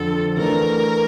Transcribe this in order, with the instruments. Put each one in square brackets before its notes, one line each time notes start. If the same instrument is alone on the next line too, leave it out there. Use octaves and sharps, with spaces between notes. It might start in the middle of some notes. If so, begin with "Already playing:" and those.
Already playing: [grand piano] F2 D3 F3 [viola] A4
[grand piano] E3 A3 D4 [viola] A#4